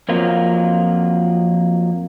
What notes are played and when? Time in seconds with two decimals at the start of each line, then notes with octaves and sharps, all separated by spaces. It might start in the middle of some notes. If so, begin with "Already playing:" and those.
0.09 F2 F3 F#3 A#3 F4